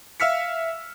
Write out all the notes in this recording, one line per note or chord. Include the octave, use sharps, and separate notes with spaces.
E5 F5 E6 F6 B6 C#7